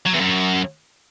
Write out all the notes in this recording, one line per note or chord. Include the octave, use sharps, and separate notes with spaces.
F#3
E2
F#2